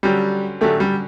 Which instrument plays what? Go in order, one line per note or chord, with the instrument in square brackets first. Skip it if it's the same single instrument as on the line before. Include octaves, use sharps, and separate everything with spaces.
[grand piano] D3 F#3 C#4 G4 [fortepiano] G3
[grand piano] D3 F#3 C#4 G4 [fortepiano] A3
[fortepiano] G3